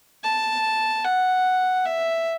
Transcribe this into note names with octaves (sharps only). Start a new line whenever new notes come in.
A5
F#5
E5